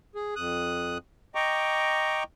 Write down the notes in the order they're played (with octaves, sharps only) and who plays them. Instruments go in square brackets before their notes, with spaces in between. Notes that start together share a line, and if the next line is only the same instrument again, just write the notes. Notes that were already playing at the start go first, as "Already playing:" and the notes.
[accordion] G#4
F2 D#6 F#6
D#5 G5 A#5 C#6 D6